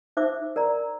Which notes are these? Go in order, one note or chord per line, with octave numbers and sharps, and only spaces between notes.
D#4 C5 E5 D6 E6
A#4 D5 A#5